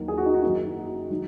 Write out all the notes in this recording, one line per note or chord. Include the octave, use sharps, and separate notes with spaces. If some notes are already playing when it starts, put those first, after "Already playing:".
Already playing: D#2 D#3 F#3 A#3
G#4
F#4
D#4
F#4
F#1 F#2 D#3 A#3 C#4 D#4
D#3 F#3